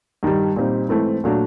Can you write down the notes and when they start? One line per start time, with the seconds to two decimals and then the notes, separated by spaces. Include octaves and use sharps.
0.23 G2 D#3 G3
0.56 A#2 G3 C4 D#4
0.89 G#2 E3 A3 C4 E4
1.24 A#2 F#3 A3 D4